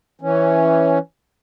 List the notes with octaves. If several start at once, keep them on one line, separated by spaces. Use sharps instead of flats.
E3 C#4